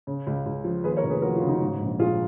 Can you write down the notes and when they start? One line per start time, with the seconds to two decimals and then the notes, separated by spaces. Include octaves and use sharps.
0.07 C#3
0.27 C#2
0.46 C#2
0.64 F3
0.84 D#2 G#4 B4
0.97 A#4 C#5
1.03 F1
1.10 G#4 B4
1.22 F3 F#4 A#4
1.36 F4 G#4
1.42 C#3
1.47 D#4 F#4
1.61 G#2
1.80 A#1
1.99 A#1 F4 G#4